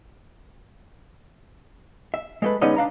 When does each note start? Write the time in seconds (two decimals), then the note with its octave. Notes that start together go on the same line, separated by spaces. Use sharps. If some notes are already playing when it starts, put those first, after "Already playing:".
2.14 E5
2.42 G#3 A3 B4
2.61 D3 G#3 B3 C#4 D#4 D#5
2.76 D4 F5 A#5